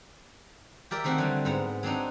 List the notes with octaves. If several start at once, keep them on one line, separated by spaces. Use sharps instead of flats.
G4 A#4 D5 E5
D#3 A3 C4 F#4
D3 F#3 G3
G#2 B3 A#5
F#3 C4 D4 D#4